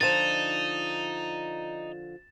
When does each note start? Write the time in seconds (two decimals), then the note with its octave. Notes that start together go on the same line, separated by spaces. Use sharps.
0.01 D3 F3 D#4 A6 E7